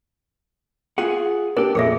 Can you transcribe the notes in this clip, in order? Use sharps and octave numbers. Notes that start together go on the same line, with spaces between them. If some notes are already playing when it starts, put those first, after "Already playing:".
F4 G#4 F#5
D4 G4 A#4
F2 A#2 G#4 A4 E5